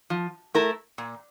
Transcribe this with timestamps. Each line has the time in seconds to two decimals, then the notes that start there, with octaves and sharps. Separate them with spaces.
0.10 F3
0.55 A3 E4 A#4
0.98 A#2